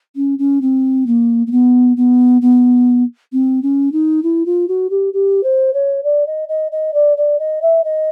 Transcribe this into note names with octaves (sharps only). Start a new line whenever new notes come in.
C#4
C#4
C4
A#3
A#3
B3
B3
B3
C4
C#4
D#4
E4
F4
F#4
G4
G4
C5
C#5
D5
D#5
D#5
D#5
D5
D5
D#5
E5
D#5